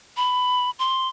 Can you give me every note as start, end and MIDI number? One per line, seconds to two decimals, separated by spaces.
0.17 0.70 83
0.79 1.08 84